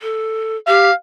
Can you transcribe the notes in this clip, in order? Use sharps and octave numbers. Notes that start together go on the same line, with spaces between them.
A4
G4 F5